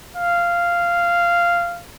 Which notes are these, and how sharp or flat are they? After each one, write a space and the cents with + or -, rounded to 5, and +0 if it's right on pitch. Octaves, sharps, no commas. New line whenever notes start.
F5 -10